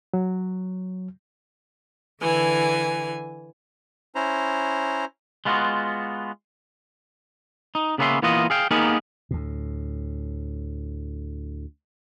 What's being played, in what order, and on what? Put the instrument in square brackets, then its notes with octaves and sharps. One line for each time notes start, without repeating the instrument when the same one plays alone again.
[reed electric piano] F#3
[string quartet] D3 E3 G#5
[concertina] C#4 E4 C5 A#5
[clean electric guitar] G#3 B3 F4 F#4
D#4
C#3 A#3 B3 C#4 E5 C6
E3 A#3 B3 F4 D#5
G#4 F5 G5
A#3 B3 D#4 G4 G#4 A#4
[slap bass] D2 A2